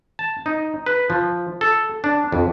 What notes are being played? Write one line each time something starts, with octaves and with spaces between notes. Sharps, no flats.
A5
D#4
B4
F3
A4
D4
F2